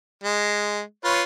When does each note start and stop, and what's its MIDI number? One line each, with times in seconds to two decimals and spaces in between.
0.24 0.81 56
1.04 1.22 65
1.04 1.22 71
1.04 1.22 73